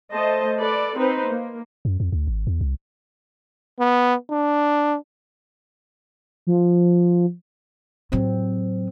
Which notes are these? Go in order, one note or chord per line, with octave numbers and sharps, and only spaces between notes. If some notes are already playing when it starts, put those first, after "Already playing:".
A3 C5 D#5 A5
A4 B4 D5
C4 D#4 B4 C5
A#3
F#2
F2
D2
G#1
E2
C2
B3
D4
F3
A2 F#3 C4